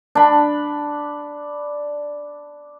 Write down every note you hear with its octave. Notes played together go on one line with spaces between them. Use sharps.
D4 B5